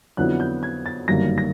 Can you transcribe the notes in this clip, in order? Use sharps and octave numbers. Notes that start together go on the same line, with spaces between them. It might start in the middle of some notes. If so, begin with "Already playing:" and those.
F2 D3 F#3 B3 E4 F#6
G6
G#6
A6
G1 F#2 D#3 G3 A#3 A#6
A#6